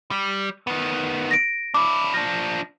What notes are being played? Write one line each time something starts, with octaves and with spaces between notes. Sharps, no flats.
G3
D#3 B3
A#6 D7
D4 E4 D6
F3 D4 A#6